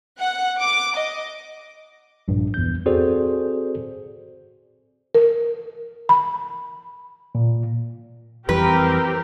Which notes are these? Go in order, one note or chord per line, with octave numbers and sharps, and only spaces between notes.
F#5
D6
D#5
A#1 G2
E2 G6
C4 F#4 G#4 A4 C5 D5
A#4
B5
A#2
F2 E3 G3 C4 G4 A#4 B4